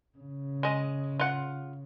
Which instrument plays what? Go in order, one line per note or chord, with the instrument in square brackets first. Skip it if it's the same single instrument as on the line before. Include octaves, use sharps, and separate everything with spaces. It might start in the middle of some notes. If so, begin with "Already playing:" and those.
[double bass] C#3
[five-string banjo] G#3 D#5
F4 F#5